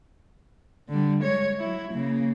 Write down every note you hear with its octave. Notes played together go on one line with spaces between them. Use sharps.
D3 G3
G#3 C#5
F#3 E4
C#3 A#3